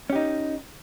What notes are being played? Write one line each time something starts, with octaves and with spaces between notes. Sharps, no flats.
C#4 D#4 G4